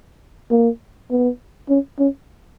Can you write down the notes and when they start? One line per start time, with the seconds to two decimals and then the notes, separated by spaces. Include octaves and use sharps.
0.51 A#3
1.11 B3
1.69 C#4
1.99 C#4